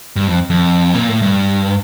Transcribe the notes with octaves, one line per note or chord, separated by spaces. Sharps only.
G2
F2
F2
A#2
A2
G2